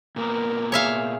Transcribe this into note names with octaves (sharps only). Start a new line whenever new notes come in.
A#2 A#3 B3 A#4
G#4 C#5 E5 F5